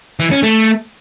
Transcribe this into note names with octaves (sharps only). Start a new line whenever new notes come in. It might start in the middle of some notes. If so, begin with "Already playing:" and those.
E3
C#4
A3